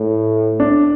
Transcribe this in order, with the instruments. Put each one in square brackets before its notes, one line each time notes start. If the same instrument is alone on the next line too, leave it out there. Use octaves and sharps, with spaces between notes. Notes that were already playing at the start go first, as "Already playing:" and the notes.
Already playing: [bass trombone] A2
[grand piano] D4